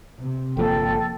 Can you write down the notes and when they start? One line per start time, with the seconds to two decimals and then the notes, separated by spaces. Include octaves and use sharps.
0.19 C3
0.57 G1 F3 A#3 A4 G5